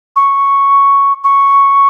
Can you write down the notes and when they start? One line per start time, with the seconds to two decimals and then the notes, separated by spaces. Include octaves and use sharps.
0.16 C#6
1.24 C#6